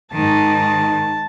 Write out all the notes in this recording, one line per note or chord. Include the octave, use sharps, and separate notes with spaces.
G#2 D#3 A5